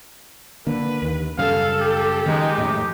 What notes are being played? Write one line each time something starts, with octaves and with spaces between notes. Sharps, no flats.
D3 A#3 B4
D#2
F#2 C#3 G3 A4 F5
G4
D#3 G#3 C#4 D#4
F2 A2